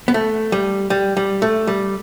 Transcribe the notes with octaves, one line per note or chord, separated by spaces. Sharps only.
B3
A3
G3
G3
G3
A3
G3